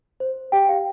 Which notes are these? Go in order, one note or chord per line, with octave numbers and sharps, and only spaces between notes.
C5
G4 G5
F5